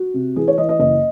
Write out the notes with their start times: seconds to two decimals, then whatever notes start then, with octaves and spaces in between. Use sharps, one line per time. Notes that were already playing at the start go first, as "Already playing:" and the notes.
Already playing: F#4
0.14 C3
0.36 E3 G#4
0.48 C#5
0.58 E3 D#5
0.69 D#5
0.79 F#1 D#5